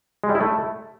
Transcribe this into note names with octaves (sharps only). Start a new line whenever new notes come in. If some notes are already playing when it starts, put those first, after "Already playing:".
G#3
G3
E4
A3